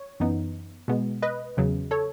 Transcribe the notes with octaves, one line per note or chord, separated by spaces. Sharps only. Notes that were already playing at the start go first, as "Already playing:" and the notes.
Already playing: C#5
F#2 E3 B3 D#4
B2 G#3 B3
B4 D#5
E2 C#3 F#3
A4 C#5